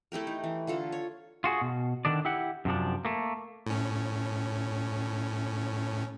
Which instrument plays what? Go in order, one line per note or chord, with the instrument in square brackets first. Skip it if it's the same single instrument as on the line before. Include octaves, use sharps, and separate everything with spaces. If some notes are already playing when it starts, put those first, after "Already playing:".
[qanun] A3 E4 G4 A#4
D#4
E3
D3 F4 A4 A#5
C#5
[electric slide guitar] F4 F#4 G#4
B2
D3 D#3 D4 D5
E4 G4 F#5
F#2 C3 F3 D4
A3 A#3
[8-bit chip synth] A2 C#4